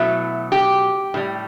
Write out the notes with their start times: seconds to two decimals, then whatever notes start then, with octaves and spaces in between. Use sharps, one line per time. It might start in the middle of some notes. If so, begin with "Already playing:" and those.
Already playing: B2 F#3 A3 E4
0.52 G4
1.14 A2 G3